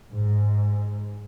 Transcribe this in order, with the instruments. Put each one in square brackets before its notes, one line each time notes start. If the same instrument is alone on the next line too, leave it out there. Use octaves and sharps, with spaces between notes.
[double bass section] G#2